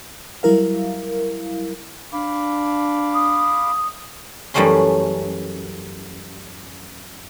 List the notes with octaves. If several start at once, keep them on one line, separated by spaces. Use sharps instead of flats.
F#3 G3 E4 A#4 F5
D4 F5 B5 D6
D#6
F#2 E3 G3 A3 C#4 C6